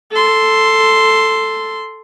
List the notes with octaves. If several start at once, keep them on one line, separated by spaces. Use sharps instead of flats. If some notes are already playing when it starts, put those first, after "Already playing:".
A4 C6